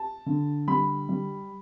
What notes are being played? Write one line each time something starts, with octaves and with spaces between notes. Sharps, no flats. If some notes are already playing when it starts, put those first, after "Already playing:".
Already playing: A5
D3
G3 B5
G3